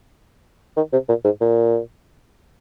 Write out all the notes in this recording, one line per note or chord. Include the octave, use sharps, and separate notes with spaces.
D#3
C3
A#2
G#2
A#2